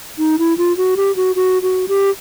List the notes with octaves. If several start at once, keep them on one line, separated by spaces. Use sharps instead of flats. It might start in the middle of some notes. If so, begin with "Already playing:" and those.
D#4
E4
F4
F#4
G4
F#4
F#4
F#4
G4